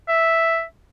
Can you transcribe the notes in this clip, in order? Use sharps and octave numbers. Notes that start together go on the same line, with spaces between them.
E5